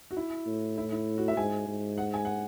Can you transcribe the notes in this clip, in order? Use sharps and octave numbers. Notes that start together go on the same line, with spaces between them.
F#4
E4
A2
E4
E4
F#4
E5
G#2 G#5
G#2
F#5
G#5
F#5